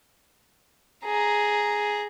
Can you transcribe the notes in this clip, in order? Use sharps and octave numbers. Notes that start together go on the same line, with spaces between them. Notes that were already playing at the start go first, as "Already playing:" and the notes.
G#4 A#5